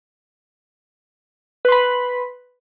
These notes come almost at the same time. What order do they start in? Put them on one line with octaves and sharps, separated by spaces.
B4 C6 B5